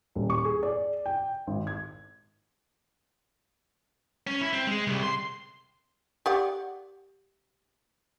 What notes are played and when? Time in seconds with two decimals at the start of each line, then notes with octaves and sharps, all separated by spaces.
0.15 D#1
0.30 C#6
0.45 G#4
0.63 D5
1.06 G5
1.47 G#1
1.67 G#6
4.27 C#4
4.41 E4
4.53 C4
4.67 G#3
4.87 C2
5.03 C6
6.26 G4 D5 F#5